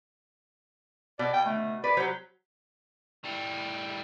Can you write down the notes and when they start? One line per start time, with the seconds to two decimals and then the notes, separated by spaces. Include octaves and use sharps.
1.19 B2 D5
1.33 G5
1.45 A3
1.84 B4 D5
1.97 F#3 G4 C5
3.24 A2 G3